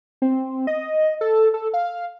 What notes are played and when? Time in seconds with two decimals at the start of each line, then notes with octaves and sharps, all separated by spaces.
0.22 C4
0.67 D#5
1.21 A4
1.54 A4
1.74 F5